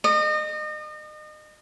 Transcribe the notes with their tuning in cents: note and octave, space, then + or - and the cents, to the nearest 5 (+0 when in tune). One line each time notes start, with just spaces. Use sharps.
D#5 -35